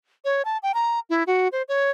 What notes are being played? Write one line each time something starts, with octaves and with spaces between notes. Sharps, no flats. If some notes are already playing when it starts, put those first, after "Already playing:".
C#5
A5
G5
A#5
E4
F#4
C5
C#5